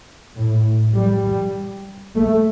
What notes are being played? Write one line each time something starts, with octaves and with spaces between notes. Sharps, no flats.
A2
G3
A3